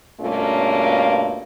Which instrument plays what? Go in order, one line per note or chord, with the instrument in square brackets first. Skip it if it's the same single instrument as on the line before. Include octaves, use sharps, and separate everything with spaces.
[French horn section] G2 B2 A3 A#3 C#4 F4